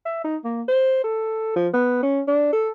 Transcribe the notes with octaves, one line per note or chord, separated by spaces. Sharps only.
E5
D#4
A#3
C5
A4
F3
B3
C#4
D4
A4